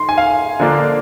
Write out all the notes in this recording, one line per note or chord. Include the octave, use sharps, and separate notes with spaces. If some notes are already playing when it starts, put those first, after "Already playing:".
Already playing: D#3 C6
G#5
F5
D3 F3 A#3 D4